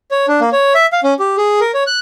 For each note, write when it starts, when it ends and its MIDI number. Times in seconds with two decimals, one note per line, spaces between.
0.11 0.26 73
0.28 0.40 62
0.41 0.50 58
0.53 0.73 73
0.75 0.86 76
0.92 1.00 77
1.03 1.14 61
1.19 1.36 67
1.38 1.60 68
1.61 1.71 70
1.74 1.83 73
1.87 1.99 90